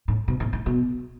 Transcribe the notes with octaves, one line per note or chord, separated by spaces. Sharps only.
A2
B2
A2
A2
B2